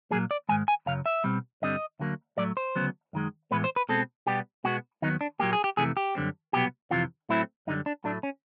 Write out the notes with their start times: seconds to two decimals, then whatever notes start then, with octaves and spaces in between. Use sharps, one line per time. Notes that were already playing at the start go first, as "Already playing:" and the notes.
0.11 A#2 F#3 A#3 G#4
0.31 D5
0.49 G#2 D#3 G#3 G#5
0.68 G#5
0.86 F#2 C#3 F#3 F5
1.06 E5
1.24 B2 G3 C4
1.62 G2 D3 G3 C4 D#5
1.99 D2 D3 F#3 A#3
2.37 A2 F#3 A3 D5
2.57 C5
2.76 D2 C#3 F#3 B3
3.13 F#2 D#3 G#3
3.51 A2 E3 G#3 B3 B4
3.64 C5
3.76 B4
3.89 B2 G#3 C4 A4
4.27 B2 G3 B3 G4
4.64 B2 G#3 B3 F#4
5.02 D#2 D#3 F#3 B3 D#4
5.21 D4
5.39 A#2 F#3 A#3 G4
5.53 G#4
5.64 G4
5.77 F2 C3 E3 A3 G#4
5.97 G4
6.15 F#2 D3 G3 C4
6.53 C2 B2 F#3 B3 G4
6.91 F2 C3 E3 F4
7.29 A2 F#3 A3 C4 E4
7.67 F#2 D3 G3 D#4
7.86 D4
8.04 A2 F#3 A3 D4
8.23 C#4